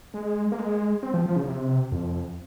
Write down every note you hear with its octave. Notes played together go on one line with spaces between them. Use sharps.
G#3
A#3
G#3
C4
F3
F3
C#3
C3
F2